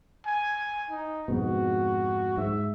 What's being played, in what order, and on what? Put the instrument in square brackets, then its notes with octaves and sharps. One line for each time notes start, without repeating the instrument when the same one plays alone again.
[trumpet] G#5
D#4
[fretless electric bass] F2 G#2 B2 [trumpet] F#4
[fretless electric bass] G#2 [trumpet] E5